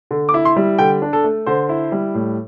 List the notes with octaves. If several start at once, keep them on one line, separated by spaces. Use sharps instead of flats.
D3
D6
E4
C6
G3
D3 G5
D4
A4
A3
D3 C5
E4
G3
A2